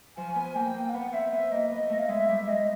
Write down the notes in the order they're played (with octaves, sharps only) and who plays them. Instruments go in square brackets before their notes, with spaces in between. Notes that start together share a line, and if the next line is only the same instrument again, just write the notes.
[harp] F3 [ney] G#5
[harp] B3
[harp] A#3 [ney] G5
[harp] A#3
[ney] F5
[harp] B3 [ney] F#5
[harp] C4 [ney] E5
[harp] B3 [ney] E5
[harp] A#3 [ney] D#5
[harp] B3 [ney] D#5
[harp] A3
[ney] F5
[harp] G#3 [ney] E5
[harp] G3
[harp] G#3 [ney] D#5